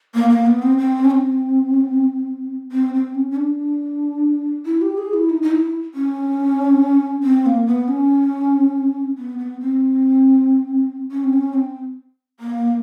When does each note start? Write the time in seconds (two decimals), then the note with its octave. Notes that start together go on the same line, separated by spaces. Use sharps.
0.14 A#3
0.30 A#3
0.46 B3
0.62 C4
0.78 C4
1.05 C#4
1.11 C4
2.72 C4
2.94 C4
3.15 C#4
3.31 C#4
3.36 D4
4.66 E4
4.82 G4
4.98 G#4
5.13 E4
5.30 D#4
5.42 D#4
5.51 E4
5.94 C#4
7.23 C4
7.46 A#3
7.67 B3
7.88 C#4
9.18 B3
9.38 B3
9.60 C4
11.11 C#4
11.24 C4
11.33 C#4
11.54 C4
12.40 A#3